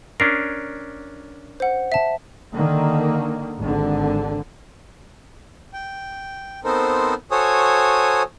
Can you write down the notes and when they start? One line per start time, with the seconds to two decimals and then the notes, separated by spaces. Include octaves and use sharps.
0.20 C#4 D4 A#4 C7
1.60 C5 F#5
1.92 E5 A5
2.53 D3 D#3 A#3
3.58 G#1 D3
5.73 G5
6.64 B3 C4 D#4 A4 A#4 C5
7.31 F#4 A4 C5 C#5 G#5 D#6